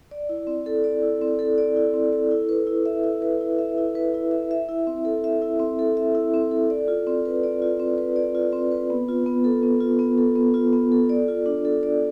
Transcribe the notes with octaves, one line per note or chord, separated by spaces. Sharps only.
D5
E4
C4
A4
D5
E4
C4
A4
D5
E4
C4
A4
E4
B4
E4
E5
E4
B4
E4
E5
E4
B4
E4
E5
E5
E4
C4
A4
E5
E4
C4
A4
E5
E4
C4
A4
D5
F4
C4
B4
D5
F4
C4
B4
D5
F4
C4
B4
B3
F4
B3
A4
B3
F4
B3
A4
B3
F4
B3
A4
D5
F4
D4
A4
D5